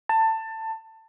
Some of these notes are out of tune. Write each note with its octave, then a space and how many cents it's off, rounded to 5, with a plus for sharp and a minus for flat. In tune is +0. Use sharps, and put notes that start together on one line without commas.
A5 +20